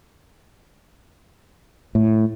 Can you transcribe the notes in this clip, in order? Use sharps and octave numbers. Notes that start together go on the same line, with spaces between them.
A2